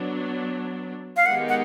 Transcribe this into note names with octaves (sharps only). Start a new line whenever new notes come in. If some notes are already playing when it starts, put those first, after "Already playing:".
Already playing: F#3 B3 D4
F5
D#3 G#3 B3 D#4 G4 F#5
F#5